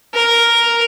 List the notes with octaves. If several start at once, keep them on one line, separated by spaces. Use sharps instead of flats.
A#4